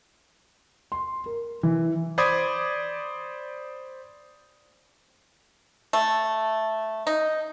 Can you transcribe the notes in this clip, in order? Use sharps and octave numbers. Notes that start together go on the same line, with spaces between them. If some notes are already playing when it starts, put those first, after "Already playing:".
C6
A#4
E3
C5 D5 B5 D6 D#6 G#6
A3
D#4